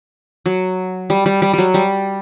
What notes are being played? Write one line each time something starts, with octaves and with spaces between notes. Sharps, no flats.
F#3
G3
G3
G3
F#3 G3
G3